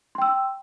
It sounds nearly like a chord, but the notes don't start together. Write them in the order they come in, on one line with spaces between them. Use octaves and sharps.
C6 G5 E6